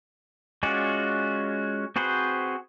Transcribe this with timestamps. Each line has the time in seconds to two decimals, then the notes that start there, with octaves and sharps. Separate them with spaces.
0.63 G#3 C#4 F4 F#4 D5
1.96 C4 F#4 G#4 B4 C5